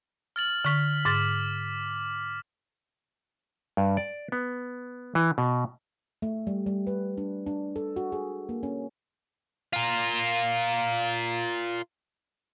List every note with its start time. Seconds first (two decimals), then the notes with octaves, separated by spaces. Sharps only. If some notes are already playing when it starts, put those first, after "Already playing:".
0.36 F6 A6 F#7
0.65 D3 C#6 F6 B6 F7
1.05 G#2 D6 F6 A6
3.77 G2
3.97 D5
4.32 B3
5.15 E3
5.38 B2
6.22 A3
6.47 G3
6.66 G3
6.87 B4
7.18 D4
7.47 D4
7.76 A4
7.96 F#4
8.12 G#4
8.49 A#3
8.63 C#4
9.73 F4 A#4